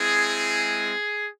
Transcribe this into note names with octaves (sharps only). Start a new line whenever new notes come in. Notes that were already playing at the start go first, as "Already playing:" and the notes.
Already playing: G#3 C4 E4 G#4